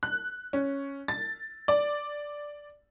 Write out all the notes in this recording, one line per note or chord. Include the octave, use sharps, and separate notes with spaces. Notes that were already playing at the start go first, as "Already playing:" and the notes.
F#6
C#4
A6
D5